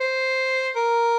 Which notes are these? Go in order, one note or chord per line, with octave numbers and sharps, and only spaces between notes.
C5
A#4